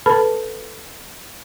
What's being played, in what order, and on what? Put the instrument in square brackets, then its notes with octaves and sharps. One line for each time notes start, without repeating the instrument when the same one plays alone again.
[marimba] A4 B4 A5 B5 F6